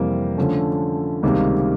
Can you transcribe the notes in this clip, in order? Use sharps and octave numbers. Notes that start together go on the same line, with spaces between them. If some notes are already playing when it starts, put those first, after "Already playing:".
Already playing: F2 C3 E3 G3 A#3
D3 F3 A3 C#4
C#2 C3 D#3 G3 A#3